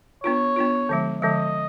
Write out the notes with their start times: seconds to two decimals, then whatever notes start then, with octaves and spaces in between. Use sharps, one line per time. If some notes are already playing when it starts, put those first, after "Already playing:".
0.24 B3 D4 F4 C#5
0.56 B3 D4 F4
0.89 D3 F3 G#3
1.22 D3 F3 G#3 D#5